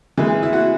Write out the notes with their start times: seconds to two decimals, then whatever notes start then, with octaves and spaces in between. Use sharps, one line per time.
0.17 C#3 E3 G#3
0.43 E4
0.53 F#4